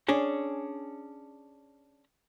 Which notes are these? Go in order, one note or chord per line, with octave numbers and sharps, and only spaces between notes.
C#4 D4 G#4